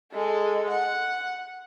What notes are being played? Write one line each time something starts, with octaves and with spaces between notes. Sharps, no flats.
G#3 A4
F#5